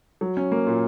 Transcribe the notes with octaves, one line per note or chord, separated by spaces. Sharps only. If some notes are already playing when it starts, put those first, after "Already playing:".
F#3
C#4
A#3
A#2